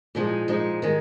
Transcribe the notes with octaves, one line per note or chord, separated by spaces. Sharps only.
A#2 F3 G#3 D#4
A#2 F3 G#3 D#4
D#3 G#3